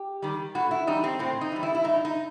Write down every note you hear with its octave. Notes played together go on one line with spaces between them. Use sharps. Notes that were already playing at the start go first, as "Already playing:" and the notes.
Already playing: G4
D#3 G3
A2 F#4
E4
E3 G3 D#4
C4
A2 C4
D#4
E3 G3
E4
E4
G2 D#4
D#4